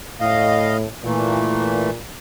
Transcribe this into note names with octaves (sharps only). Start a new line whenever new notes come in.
A2 D#5 F5
A#2 E3 A3